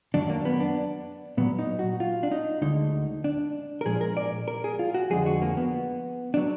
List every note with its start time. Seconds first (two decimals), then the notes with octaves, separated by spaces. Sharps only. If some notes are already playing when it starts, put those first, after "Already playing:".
0.14 F#2 D#3 F#3 D4
0.30 A#3
0.45 B3
0.60 D4
1.37 A#2 F#3 B3
1.59 D#4
1.79 F#4
2.00 F4
2.23 D4
2.31 D#4
2.62 D2 D3 G#3 D#4
3.24 D4
3.81 A#4
3.86 A#2 F3 G#3 G#4
4.01 A#4
4.17 D5
4.48 A#4
4.64 G#4
4.79 F4
4.94 F#4
5.10 F2 D3 F3 G#3 G#4
5.26 F#4
5.42 A#3
5.57 B3
6.34 F#3 D4